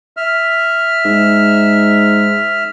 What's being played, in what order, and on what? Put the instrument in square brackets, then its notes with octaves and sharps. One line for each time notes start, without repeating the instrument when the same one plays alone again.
[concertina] E5 F6
[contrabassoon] G#2